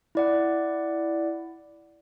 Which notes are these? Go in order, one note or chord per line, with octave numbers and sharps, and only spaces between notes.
E4 D5 F#5